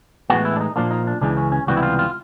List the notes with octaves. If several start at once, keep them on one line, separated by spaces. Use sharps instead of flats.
A2 E3 G#3 B3 F#4
E4
D4
D#4
A#2 F3 A#3 D4
D#4
D4
C#2 C#3 E3 G#3 D4
C#4
C#4
C#2 C3 E3 G3 B3 F#4
E4
F4
F4